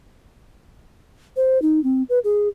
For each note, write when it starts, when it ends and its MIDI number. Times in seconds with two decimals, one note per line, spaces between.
1.36 1.61 72
1.62 1.82 63
1.84 2.03 60
2.09 2.19 71
2.24 2.48 68